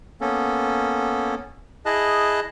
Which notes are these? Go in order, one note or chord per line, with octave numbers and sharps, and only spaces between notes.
A#3 B3 C#4 A4
E4 G#4 D#5 A5 F#6